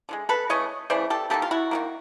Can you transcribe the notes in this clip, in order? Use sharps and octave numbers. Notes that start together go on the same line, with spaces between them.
D3 F3 G#3
A4 B4
C#3 E3 A3 C#5 D#5
C#3 E3 A3 C5 D5
G4 A4
D#3 G3 A#3 G4 A4
F4
E4 F#4
D#3 G3 A#3